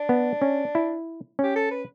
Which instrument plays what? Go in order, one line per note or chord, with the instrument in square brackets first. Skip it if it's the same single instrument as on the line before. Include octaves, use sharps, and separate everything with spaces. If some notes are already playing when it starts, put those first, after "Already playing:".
Already playing: [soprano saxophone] D4
[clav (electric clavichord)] B3
C#4
E4
[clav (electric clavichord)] C#4 [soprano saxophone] G4
[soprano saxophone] A4
B4